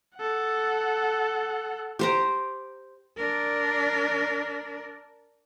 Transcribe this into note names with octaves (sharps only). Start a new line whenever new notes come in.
A4 F#5
G4 C5 A#5
D4 A#4